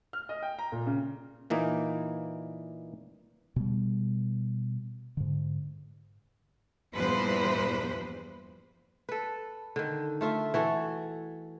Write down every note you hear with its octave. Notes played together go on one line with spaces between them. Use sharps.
F6
D#5
G5
A#5
A#2
C#3
A#2 E3 A#3 D#4
B2 G3
G#2 D3
E2 G2 A#2 F3 B4 C5
A4 B4
D3 D#3
A3 F4 E5
E3 F#4 A4